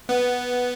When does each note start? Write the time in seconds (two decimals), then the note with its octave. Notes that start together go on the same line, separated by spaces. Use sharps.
0.09 B3